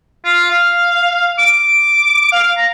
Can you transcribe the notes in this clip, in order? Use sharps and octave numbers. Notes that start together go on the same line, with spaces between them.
F4
F5
D6
F5
A#5